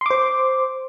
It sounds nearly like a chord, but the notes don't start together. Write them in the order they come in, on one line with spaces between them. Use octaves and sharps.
C6 D6 C5